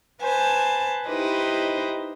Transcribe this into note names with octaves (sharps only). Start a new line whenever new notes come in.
B4 C5 G#5 A5
D#4 E4 G4 B4 C5 D#5